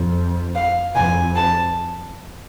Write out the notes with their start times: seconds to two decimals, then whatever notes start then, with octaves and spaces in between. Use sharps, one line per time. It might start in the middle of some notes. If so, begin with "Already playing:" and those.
Already playing: F2
0.55 F5
0.95 F2 G#5
1.36 A5